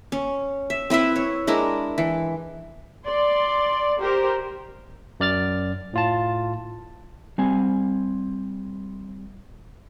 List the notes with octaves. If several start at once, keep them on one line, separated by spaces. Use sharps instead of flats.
C#4
E5
C4 E4 B4 E5
C#5
G#3 D4 E4 A#4
E3
D5 C6
G4 A#4 C5
F#2 D5 F6 A6
A2 F4 A5
G3 C4 G#5